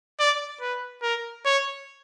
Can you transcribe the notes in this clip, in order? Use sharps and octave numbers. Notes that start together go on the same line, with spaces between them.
D5
B4
A#4
C#5